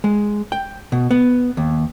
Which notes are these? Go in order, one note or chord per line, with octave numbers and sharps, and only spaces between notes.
G#3
G5
B2
B3
D#2